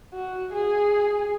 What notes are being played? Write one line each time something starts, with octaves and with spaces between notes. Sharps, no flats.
F#4
G#4